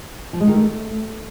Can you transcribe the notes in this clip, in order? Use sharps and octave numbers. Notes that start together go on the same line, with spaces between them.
F3
G#3
D#3
A3